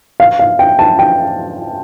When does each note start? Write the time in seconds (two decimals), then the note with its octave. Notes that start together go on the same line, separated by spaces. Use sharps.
0.20 F5
0.39 F5
0.59 G5
0.79 A5
0.99 G5